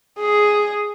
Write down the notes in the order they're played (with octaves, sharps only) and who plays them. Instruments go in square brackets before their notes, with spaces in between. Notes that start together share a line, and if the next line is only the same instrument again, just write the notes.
[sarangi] G#4